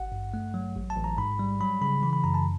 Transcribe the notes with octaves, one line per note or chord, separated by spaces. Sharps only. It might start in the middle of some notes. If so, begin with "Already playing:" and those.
Already playing: G#1 F#5
G2
A3
F#3
A1
A5
A1
A#5
G#2 B5
G3
F#3 B5
C#3 B5
E3 B5
B5
F#2 A#5
A5